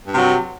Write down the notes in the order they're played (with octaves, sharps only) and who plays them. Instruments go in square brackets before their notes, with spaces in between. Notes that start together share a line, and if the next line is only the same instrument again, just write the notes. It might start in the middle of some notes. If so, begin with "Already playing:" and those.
[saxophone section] G2
C3
F#3